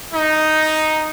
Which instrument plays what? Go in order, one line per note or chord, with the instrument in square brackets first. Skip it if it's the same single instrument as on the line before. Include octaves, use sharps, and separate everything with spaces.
[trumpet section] D#4